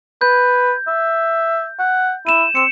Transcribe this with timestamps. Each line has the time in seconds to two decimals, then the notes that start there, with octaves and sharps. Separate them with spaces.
0.21 B4 G6
0.88 E5
1.79 F#5
2.27 E4 D#7 E7
2.55 C4 C#7 E7